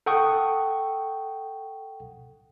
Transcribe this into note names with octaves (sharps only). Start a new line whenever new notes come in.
A4 F#5 G5 C#6 D#6